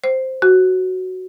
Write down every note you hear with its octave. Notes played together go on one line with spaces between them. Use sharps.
C5
F#4